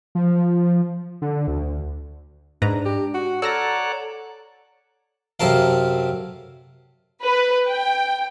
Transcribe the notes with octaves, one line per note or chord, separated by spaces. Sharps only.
F3
D3
D2
G#2 D4 B4 A#5
G4
F#4
A4 C#5 D5 F#5 A#5 E6 F6 A#6
F#2 C3 A4 A#4 F5
B4
G5